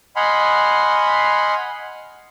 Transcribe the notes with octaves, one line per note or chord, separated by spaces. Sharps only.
D#5 F#5 G#5 B5 C6 F6